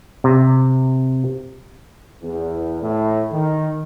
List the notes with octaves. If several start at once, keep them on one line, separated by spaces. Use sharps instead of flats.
C3
E2
A2
D#3